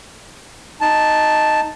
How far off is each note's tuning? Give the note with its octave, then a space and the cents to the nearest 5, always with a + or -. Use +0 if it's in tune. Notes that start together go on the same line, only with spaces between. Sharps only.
D#4 +0 A5 +0